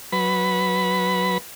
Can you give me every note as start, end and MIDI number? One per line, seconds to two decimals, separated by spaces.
0.12 1.38 54
0.12 1.38 71
0.12 1.38 83